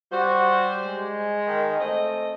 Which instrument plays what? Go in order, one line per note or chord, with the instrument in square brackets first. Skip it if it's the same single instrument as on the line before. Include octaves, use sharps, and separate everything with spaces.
[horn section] G3 C5 [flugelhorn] F#4
[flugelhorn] G#3
[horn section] D#3
A3 C4 D#5